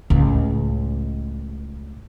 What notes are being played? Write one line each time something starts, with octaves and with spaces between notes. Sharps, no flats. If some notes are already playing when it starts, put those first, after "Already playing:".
C#2 A2